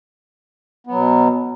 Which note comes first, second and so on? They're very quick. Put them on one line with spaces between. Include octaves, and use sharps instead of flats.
B3 F#3 B2